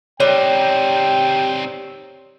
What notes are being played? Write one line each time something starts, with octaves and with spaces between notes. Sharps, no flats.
G3 C4 D#4 C#5 G5